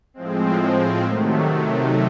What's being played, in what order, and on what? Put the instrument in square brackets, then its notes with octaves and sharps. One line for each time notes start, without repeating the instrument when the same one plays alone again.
[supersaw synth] A2 F3 G#3 C4
C3 D#3 F#3 A3